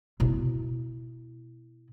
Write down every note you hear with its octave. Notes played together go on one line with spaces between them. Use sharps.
B2 E4